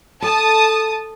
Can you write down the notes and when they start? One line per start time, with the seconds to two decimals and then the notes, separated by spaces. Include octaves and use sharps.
0.22 A4 A5 D#6